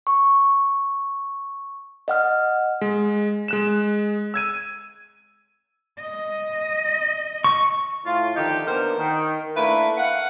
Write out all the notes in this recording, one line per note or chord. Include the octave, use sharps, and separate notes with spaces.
C#6
D#5 F#5 F6
G#3
G#3 F#6 E7
E6 G#6 D#7
D#5
C#6
A2 F4
D3 D#3 F3 D#4 G4 G5
A#3 B3 D4 A#4 C5
D#3
A3 A#3 D4 E4 B4
F5 F#5